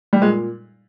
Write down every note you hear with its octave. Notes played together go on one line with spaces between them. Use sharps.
G3
A#2 G#3